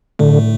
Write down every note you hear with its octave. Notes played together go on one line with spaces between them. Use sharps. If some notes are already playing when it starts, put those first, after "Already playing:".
A2 D3 A3